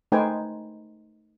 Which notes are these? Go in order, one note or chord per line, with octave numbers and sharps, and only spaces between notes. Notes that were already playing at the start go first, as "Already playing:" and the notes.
A3 D#4 B4 C5 G5 G#5